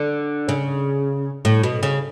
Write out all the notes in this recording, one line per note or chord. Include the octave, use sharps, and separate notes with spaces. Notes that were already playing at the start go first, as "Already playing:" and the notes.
Already playing: D3
C#3
A2
B2
C#3